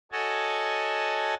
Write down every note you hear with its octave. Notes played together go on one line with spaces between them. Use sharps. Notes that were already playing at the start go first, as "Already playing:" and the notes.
F#4 A4 C#5 D#5 G#5 A5